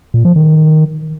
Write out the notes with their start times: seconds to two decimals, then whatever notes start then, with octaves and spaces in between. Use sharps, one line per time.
0.14 A#2
0.25 F3
0.36 D#3